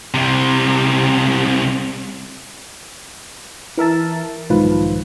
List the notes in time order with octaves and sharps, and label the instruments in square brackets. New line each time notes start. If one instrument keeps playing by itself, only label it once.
[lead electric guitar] C2 C3
[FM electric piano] E3 A#4 E5 A5
B1 G#2 D#3 F3 F4 B4